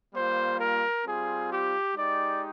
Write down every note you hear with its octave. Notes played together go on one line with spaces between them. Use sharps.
G3 A#3 F4 C5
A#4
G3 C4 F4 G#4
G4
G#3 D#4 G4 D5